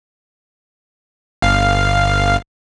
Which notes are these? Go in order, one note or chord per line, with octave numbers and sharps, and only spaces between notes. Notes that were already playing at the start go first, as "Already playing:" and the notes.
G1 F5